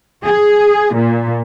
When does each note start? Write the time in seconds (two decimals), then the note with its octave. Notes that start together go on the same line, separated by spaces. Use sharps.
0.24 G#4
0.95 A#2